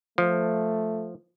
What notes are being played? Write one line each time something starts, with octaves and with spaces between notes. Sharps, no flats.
F3 A3